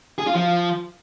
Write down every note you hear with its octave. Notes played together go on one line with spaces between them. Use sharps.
G#4
F4
F3